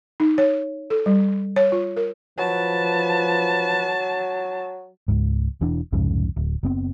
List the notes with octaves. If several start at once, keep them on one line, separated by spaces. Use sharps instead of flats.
D#4
C#5
A4
G3
C#5
F4
A#4
F3 F#3 B4 A5
C#2 G#2
E1 E3 D4
C2 F2 G#2 C#3
D1
F#1 B3 C4